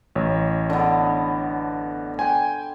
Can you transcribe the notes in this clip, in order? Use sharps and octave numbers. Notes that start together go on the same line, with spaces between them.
A1 C#5
D3 B3
C5 G5 G#5